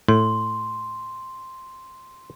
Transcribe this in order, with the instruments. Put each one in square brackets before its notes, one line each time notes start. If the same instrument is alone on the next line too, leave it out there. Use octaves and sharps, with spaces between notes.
[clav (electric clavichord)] A2 [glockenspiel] C6